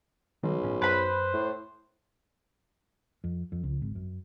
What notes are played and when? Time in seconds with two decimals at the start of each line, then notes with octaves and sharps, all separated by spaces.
0.43 B1 D#3 F#3 G3
0.61 G1 A2 C#4
0.82 F#2 B4 C5 B5
1.34 A2
3.24 F2
3.52 F2
3.64 C#2
3.82 G#1
3.95 F#2